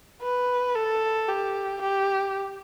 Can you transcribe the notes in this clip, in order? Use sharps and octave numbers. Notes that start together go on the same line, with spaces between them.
B4
A4
G4
G4